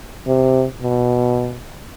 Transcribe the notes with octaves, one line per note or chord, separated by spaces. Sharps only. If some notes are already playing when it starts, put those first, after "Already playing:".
C3
B2